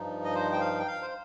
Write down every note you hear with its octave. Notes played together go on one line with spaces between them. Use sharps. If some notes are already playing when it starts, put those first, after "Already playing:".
Already playing: G2 F3 D#4
D#5
C5
G5
F5
G5
F5
C5